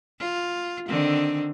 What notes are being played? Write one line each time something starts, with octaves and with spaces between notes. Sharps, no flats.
F4
D3 D#3 C4